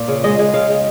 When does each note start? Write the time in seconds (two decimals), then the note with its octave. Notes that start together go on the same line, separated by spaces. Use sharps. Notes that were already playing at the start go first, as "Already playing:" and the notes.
Already playing: A#2
0.08 C#3
0.24 G#3 D#5
0.39 G#3
0.54 C#3 F5
0.70 G#3